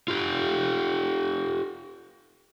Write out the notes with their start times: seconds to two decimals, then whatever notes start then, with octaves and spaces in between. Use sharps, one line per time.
0.08 F4 G4